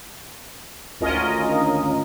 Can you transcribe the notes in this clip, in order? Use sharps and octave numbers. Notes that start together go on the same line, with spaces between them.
G#1 D2 C#4 F4 A#4 D#5